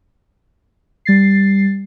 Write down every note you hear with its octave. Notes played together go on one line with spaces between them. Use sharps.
G3 A6 C7